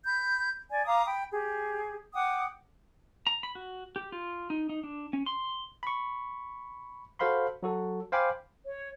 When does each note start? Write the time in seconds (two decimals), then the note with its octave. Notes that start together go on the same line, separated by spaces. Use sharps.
0.06 B5 G6
0.69 D5 G#5
0.86 F5 A#5 D6 D#6
1.06 G5 B5
1.32 G4 G#4
2.15 F#5 G5 D6 D#6
3.27 A#5
3.43 B5
3.55 F#4
3.96 G4
4.12 F4
4.50 D#4
4.69 D#4
4.83 D4
5.13 C#4
5.26 C6
5.83 B5 C#6
7.19 F#4 A4 C5 F5 B5 C6
7.63 F#3 F#4 A4
8.12 C5 F5 G5 G#5 B5 D6
8.64 C#5